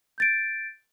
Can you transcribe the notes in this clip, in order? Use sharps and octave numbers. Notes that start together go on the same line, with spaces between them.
G6 A6 D7